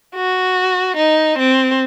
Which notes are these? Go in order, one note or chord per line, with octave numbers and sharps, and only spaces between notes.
F#4
D#4
C4